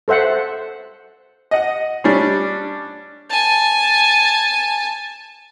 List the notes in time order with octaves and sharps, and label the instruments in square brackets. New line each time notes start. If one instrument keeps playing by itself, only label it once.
[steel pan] A4 C5 E5 F#5
[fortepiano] D#5 F#5
G3 C#4 D4
[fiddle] G#5 A5